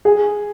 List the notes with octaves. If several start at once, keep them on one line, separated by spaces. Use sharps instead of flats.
G#4